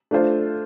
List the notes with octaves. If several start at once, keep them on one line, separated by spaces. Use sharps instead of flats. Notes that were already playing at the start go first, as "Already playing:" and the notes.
A3 D4 F4 C5